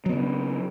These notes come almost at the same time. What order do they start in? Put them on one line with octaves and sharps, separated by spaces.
F#3 B3 C#3